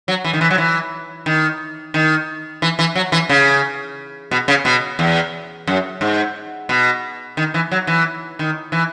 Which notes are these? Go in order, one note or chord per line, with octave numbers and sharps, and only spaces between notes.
F#3
E3
D#3
E3
F#3
E3
D#3
D#3
E3
E3
F#3
E3
C#3
B2
C#3
B2
E2
F#2
G#2
B2
D#3
E3
F#3
E3
D#3
E3